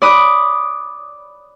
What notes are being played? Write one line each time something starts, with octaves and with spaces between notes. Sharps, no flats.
D5 B5 D#6 F#6